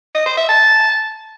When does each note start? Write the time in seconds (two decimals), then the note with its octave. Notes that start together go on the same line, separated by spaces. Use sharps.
0.15 D#5
0.26 C5
0.37 E5
0.49 A5